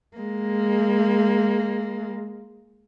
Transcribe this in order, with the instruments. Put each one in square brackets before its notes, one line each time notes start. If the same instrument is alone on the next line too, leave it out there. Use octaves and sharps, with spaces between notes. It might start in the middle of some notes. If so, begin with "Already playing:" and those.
[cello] G#3 A#3